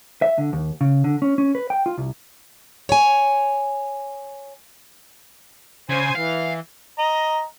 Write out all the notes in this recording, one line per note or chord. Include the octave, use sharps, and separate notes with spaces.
E5
D3
D#2
C#3
D3
C#4
C#4
B4
G5
F4
C2
C#5 G#5
C#3 C5 G#5
E3 F5
D#5 A#5